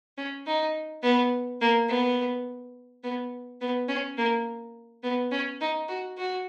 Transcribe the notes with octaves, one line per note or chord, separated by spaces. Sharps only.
C#4
D#4
B3
A#3
B3
B3
B3
C#4
A#3
B3
C#4
D#4
F#4
F#4